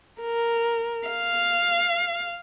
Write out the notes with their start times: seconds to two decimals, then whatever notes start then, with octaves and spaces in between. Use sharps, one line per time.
0.21 A#4
1.08 F5